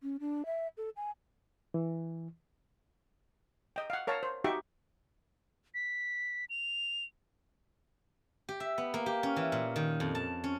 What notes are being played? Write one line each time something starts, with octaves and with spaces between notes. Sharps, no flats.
C#4
D4
E5
A4
G#5
E3
D#5 G5
F5 F#5
A#4 C#5 F5 A5 A#5
C5
D#4 F#4 G4 E5 G5 C#6
B6
F7
G4
E5
B3
A#3
G4
C#4
E3
A#2
D#3
F2
A5
C#4